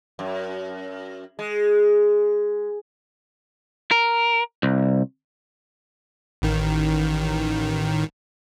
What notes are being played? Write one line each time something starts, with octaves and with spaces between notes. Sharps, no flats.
F#2
G#3
A#4
C2
A1 D#3